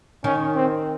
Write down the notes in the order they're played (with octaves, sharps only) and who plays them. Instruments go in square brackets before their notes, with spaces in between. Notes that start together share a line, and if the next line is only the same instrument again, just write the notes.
[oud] D#3 [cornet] C#4
[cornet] C4